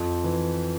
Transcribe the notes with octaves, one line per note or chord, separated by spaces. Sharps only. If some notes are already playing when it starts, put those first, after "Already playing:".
Already playing: F2
E3